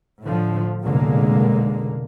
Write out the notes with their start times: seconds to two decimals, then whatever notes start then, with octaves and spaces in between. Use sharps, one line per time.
0.22 A2 D3 F3
0.84 F1 B1 A#2 D3 G#3 A#3